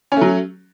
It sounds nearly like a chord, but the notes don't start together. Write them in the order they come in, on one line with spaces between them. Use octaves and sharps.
C#4 A3 F#3